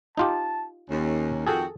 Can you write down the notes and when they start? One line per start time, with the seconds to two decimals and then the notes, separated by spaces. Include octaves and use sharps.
0.18 D#4 F4 G4 A5
0.90 D#2 C#4
1.47 F2 D#3 F#4 G#4 A4 G5